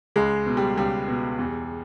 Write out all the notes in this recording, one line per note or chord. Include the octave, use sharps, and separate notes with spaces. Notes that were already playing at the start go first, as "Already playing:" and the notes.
C#2 G#3
B2
G3
C#2 G3
B2
E2